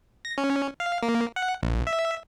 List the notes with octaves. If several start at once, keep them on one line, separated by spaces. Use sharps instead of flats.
A#6
C#4
F5
A#3
F#5
A#1
E5